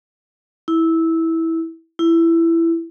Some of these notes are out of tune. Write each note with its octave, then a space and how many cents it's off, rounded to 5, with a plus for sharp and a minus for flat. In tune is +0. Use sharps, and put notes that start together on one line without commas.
E4 -15
E4 +15